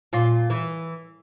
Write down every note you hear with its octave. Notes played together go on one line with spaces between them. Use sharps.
A#2 F4
E3